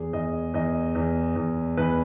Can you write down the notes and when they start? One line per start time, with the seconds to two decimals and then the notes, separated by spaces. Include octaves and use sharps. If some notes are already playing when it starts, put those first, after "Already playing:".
Already playing: E2 G#4
0.13 E2 D#5
0.54 E2 D#5
0.95 E2
1.36 E2
1.77 E2 B4